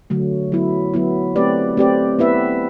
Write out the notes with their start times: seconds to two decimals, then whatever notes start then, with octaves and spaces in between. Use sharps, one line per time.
0.10 D3 F#3 A3
0.52 F#3 B3 E4
0.94 F#3 B3 E4
1.36 A3 C4 G4 B4 D5
1.77 A3 C4 G4 B4 D5
2.19 B3 E4 B4 E5